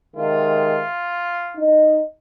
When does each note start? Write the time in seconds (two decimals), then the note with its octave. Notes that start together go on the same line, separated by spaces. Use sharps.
0.15 C3 D#3 G#3 F4
1.57 D#4